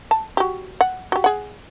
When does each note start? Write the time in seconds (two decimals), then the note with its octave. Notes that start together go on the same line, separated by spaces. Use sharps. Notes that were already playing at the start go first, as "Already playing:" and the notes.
0.11 A5
0.37 F#4 G4
0.81 F#5
1.12 F#4 G4
1.24 G#4 F#5